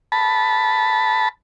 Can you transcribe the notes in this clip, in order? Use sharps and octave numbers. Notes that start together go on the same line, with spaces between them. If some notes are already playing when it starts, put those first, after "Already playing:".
A5 B5